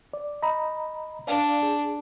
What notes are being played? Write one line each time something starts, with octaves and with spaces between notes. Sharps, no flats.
D5
D#5 A#5 B5
D4 D5 F5 A5
G#4